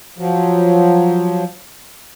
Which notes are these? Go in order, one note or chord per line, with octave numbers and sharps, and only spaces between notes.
F3 F#3